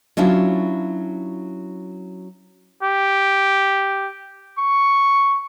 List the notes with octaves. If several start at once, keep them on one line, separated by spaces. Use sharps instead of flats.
F#3 C#4 D4 E4 F4
G4
C#6